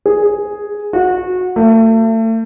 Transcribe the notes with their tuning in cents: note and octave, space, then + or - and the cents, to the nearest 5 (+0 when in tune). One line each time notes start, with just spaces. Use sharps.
G#4 +0
F#4 -25
A3 +35